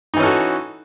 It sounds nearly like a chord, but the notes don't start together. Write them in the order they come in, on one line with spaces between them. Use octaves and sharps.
D#4 E3 C#4 A4 F#4